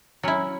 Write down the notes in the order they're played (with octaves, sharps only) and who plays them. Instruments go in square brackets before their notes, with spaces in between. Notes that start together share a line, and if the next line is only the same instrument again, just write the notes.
[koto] F#3 C#4 E4